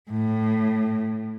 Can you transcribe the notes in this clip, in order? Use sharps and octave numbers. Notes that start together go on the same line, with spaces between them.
A2